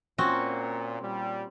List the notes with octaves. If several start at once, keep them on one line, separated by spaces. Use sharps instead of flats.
A#2 C4 C#4 F#4
A#2 G3